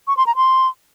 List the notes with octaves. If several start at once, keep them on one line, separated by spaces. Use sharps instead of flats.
C#6
C6
A#5
C6